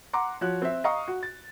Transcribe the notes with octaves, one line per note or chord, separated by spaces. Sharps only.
F#5 A#5 C6 D6
F3 F#4 C#5 F#6
C4 E5
D#5 F5 A#5 C#6 D#6
F#4
A6